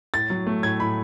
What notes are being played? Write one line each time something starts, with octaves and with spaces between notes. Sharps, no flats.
A2 A6
F#3
A3
A2 G#6
A2 B5